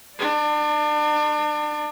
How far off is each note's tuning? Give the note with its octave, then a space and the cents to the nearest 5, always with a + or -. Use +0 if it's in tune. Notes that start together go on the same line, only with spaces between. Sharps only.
D4 +35 D5 +0